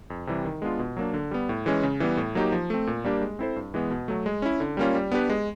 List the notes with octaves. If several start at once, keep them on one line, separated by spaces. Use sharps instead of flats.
F2
C3 E3 G3
D#3
G#3 B3 D4 F4
B2
F#3 A#3 D4
D3
G3 B3
A2
E3 G#3 C#4
C#3
E3 G3 B3
A2
F#3 A#3 D#4 G4
F3
A3 C4
A#2
G3 A#3 D4 G4
G#3
C4 E4 A4 C5
G2
E3 G#3 B3
B2
F#3 A3
G#3
C#4 E4
D3
G3 A#3 C#4 F4
G3
B3 D4 G4 B4
G#3